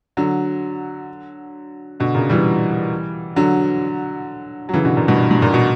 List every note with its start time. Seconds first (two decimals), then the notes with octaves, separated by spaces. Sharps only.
0.17 D3 F#3
2.00 B2 D3
2.15 A#2 C#3
2.30 E3 G3
3.36 D3 F#3
4.69 F#3
4.74 C#3 E3
4.85 B2 D3
4.97 A#2
5.08 G2 B2
5.31 G2
5.42 A#2
5.54 B2